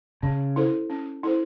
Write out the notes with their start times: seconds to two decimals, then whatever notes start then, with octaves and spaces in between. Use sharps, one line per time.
0.23 C#3 C#4
0.56 E4 A4 C5
0.90 C#4
1.23 E4 A4 C5